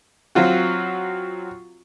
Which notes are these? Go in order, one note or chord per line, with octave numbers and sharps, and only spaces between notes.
F#3 C4 F4 F#4